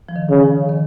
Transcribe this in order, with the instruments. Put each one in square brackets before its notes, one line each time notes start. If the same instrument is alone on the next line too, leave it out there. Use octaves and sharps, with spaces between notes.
[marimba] F3
D#3
[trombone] C#3
[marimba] F3
D#3